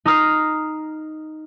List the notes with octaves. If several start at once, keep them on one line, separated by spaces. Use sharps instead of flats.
D#4 A#5 D#6 F6 C7